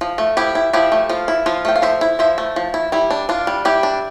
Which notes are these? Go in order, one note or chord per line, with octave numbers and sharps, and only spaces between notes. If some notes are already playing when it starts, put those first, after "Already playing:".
F3
A3
F3 E4 G4
E4
F3 E4 G4
A3
F3 F4
E4
F3 F4
A3 G5
F5
F3 C5 E5
E4
F3 C5 E5
A3
F3
E4
G3 E4
D4
D4 F4
G3
G3 E4 G4
D4